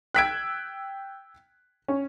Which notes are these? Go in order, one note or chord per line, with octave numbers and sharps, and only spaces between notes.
G5 E6 F#6 G#6 B6 D7
C#4